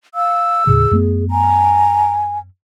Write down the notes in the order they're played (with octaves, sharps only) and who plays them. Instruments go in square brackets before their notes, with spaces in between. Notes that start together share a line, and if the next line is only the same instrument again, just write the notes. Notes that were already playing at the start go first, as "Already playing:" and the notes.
[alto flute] F5 [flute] E6
[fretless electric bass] D#2 A2 C#3 [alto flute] G#4
[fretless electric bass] F#2 A3 B3
[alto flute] G#5 [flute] A#5